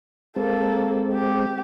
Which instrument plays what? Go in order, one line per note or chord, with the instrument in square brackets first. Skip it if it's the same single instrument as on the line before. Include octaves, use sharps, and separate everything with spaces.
[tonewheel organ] G#3 C4 [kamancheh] A#3 A4
[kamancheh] G4